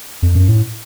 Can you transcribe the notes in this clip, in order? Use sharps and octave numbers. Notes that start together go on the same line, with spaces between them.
F2
F#2
A2